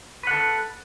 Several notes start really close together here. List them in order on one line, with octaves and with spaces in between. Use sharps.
B4 F#5 A4